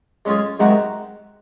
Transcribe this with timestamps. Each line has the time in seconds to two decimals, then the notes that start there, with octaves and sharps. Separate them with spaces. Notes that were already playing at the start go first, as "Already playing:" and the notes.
0.25 G#3 C#4 F4 G#4
0.59 C3 D#3 G#3 D#4 F#4